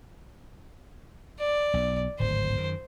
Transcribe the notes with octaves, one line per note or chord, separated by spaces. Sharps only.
D5
B1
D1 G#1 C5
F#2 D#3